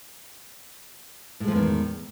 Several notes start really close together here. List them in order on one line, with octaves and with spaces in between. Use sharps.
A2 G#3 F3 E2 D#3